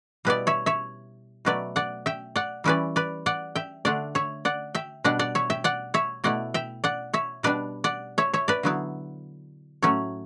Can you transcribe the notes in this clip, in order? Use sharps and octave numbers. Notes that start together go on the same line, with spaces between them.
B2 G3 B3 E4 B4 D5
C#5 E5
C#5 E5
B2 F#3 A3 B4 D5
D5 F#5
E5 G5
D5 F#5
E3 G3 C#4 E4 B4 D5
B4 D5
D5 F#5
E5 G5
D3 A3 D4 D5 F#5
C#5 E5
D5 F#5
E5 G5
B2 G3 D4 D5 F#5
D5 F#5
C#5 E5
E5 G5
D5 F#5
C#5 E5
B2 A3 E4 D5 F#5
E5 G5
D5 F#5
C#5 E5
B2 G3 D4 B4 D5
D5 F#5
C#5 E5
C#5 E5
B4 D5
D3 F#3 B3 E4
A2 F#3 A3 C#4 C#5 E5